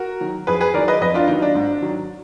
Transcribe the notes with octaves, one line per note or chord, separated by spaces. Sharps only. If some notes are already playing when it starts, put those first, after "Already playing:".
Already playing: F#4 A#4
D#3 F#3
F2 G#4 B4
G#4 B4
D#3 F#3 A#4 D5
B4 D#5
F2 B4 D#5
D4 F4
D#3 F#3 D#4
D4
G#2
D#3 F#3